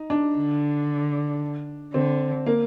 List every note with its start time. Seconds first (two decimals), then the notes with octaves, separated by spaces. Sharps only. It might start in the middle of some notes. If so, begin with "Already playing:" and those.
Already playing: D#4
0.10 D4
0.36 D3
1.94 D3 C4
2.46 A#3